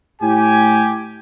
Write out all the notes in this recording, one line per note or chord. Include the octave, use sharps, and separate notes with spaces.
A2 G4 G#5